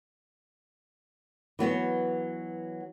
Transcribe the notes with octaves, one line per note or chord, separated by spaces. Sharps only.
E3 F#3 B3 F#4